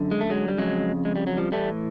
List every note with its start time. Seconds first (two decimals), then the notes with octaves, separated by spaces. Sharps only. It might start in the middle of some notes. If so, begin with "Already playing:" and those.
Already playing: F#2 D3
0.11 G#3
0.21 A3
0.30 F#3 G#3
0.48 G3
0.58 F2 C#3 F#3 G#3
1.05 G#3
1.16 G3
1.27 F#3
1.37 F3 G3
1.52 A2 E3 G3 A3